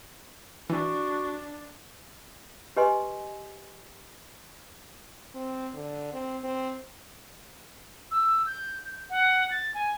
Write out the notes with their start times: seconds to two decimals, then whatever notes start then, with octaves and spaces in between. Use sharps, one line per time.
0.70 E3 D4 F#4
2.77 G4 B4 D#5 G#5 C6
5.35 C4
5.75 D3
6.13 C4
6.43 C4
8.11 E6
8.46 G6
9.09 F#5
9.51 A6
9.74 G#5